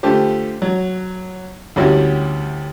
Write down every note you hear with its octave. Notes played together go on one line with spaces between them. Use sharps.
D3 A3 F4 G4 C5
F#3
D2 G3 C#4 E4 F#4 G4